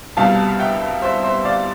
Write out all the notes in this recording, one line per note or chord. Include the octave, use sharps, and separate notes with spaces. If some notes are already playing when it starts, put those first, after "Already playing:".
C2 B2 G3 F5 A5
E5 G5
C5 E5
C5 E5
D5 F5